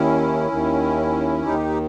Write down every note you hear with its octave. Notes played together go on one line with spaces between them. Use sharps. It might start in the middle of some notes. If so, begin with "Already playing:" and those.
Already playing: D#2 D#3 C#4 E4
D#2 D#3
D#2 D#3 D#4 G4